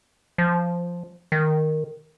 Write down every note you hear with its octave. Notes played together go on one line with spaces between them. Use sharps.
F3
D#3